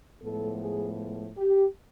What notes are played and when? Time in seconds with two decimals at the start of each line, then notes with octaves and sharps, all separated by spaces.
0.23 A2 F3 G#3 B3 A4
0.61 G#4
1.37 G4